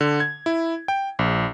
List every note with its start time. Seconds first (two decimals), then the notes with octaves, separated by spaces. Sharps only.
0.01 D3
0.20 G#6
0.46 E4
0.88 G5
1.19 A#1